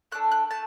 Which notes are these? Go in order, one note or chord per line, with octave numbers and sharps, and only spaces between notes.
A3 D4 A4 F#6
F#6
A3 A5